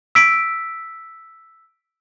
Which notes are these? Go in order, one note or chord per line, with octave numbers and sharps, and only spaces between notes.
E6 B6 D7